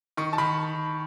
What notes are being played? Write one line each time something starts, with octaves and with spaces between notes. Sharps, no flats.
D#3 C#6
A5
D#3 B5